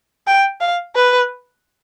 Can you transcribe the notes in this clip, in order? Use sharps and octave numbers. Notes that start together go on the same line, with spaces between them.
G5
F5
B4